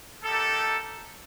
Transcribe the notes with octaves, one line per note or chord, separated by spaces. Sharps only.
A#3 D#4 G4 A4